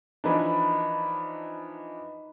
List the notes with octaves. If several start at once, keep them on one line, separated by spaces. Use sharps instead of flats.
E3 F3 D4 D#4 B4